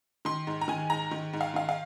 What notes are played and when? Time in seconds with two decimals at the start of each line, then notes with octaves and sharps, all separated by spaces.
0.25 D#3 C6
0.47 G#2
0.61 A#5
0.68 D#3 G#5
0.90 G#2 A#5
1.11 D#3
1.33 G#2
1.41 F5
1.54 D#3 F5
1.69 F5